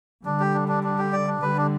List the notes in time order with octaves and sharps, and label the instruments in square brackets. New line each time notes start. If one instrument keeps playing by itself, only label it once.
[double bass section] D3 G3 [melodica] D4
[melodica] G4
D4
D4
D4
G4
D5
D4
[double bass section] D3 G3 [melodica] B4
[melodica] D4